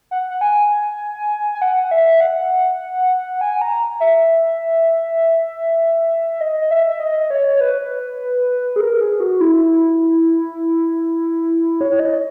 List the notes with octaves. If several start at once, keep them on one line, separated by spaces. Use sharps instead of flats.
F#5
F#5
G#5
G#5
F#5
E5
F#5
G#5
A#5
E5
D#5
E5
D#5
C#5
B4
G#4
A#4
G#4
F#4
E4
C#5
D#5